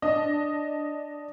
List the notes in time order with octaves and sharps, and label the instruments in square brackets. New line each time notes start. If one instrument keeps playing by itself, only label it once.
[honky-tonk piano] D4 D#5